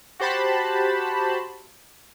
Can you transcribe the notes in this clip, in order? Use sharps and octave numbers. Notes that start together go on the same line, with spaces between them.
F#4 G4 C5 A5 B5